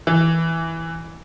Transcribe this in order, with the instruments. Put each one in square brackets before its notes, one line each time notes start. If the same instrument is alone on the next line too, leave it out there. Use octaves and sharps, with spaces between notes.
[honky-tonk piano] E3